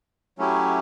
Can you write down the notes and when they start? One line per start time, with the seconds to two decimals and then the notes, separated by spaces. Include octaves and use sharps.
0.38 F#3 A3 C#4 E4 G4